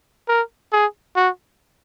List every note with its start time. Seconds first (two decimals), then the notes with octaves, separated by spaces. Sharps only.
0.28 A#4
0.72 G#4
1.16 F#4